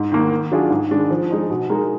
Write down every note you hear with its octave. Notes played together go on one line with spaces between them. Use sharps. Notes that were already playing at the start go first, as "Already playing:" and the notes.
Already playing: G#2
D#3 A#3
D#3
F#3 D4 F4 G#4
G#2
D#3 G#3 D4
F3
G#3 D#4
B2
G#3 D#4 A#4